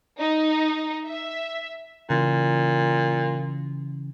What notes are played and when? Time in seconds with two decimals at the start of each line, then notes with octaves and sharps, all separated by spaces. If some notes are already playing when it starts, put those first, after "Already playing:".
0.19 D#4
1.08 E5
2.10 A#2 C#3 E3